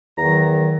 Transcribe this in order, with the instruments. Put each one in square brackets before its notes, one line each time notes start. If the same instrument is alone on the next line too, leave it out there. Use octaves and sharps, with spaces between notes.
[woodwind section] E2 D#3 F#3 A#5